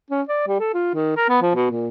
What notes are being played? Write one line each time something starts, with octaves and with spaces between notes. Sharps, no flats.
C#4
D5
G3
A4
F4
D#3
A#4
B3
F3
B2
A#2